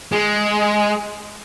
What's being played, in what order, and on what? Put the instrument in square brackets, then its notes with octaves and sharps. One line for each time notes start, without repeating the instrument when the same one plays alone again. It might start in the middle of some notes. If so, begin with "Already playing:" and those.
[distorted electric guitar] G#3